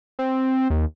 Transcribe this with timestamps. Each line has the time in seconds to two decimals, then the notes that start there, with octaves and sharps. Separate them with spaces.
0.19 C4
0.70 D#2